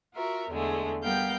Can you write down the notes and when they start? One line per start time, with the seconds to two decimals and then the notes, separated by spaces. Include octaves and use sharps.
0.13 F4 F#4 A#4 E5
0.49 E2 D3 G#3 A3
1.02 G3 B3 A#4 F5 G5 G6